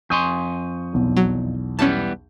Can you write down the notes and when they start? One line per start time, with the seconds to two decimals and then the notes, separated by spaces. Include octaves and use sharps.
0.10 F2 G#5 C6 C#6 D#6 G6
0.93 B1 E2
1.17 F#3
1.79 E3 G3 B3 C#4 A5